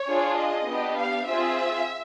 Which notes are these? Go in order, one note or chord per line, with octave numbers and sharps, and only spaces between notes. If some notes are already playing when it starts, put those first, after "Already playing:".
Already playing: C#5
D4 F4 G#4
D#5
B3 D4 G4
F5
C4 F4 G#4 E5